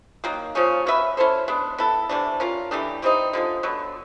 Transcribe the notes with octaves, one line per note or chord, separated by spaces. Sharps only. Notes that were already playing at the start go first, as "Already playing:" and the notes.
D#3 F#3 A#3
C#3 F3 A#3 C#4
C#4 F#4 B4 E5
C#4 E4 A4 C5
G#3 B3 D4
B3 E4 A4
C3 E3 A3 D4
C#4 F4 A#4
E3 A3 D4 G4
E3 G3 C4 D#4
D3 F3 G#3
D3 F#3 B3